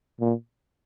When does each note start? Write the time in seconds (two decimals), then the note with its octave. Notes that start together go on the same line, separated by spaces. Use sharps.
0.21 A#2